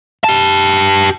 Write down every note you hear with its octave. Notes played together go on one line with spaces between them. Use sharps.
G4 A5